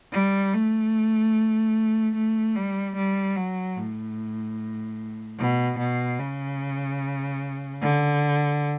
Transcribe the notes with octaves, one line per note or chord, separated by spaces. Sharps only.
G3
A3
A3
G3
G3
F#3
A2
B2
B2
C#3
D3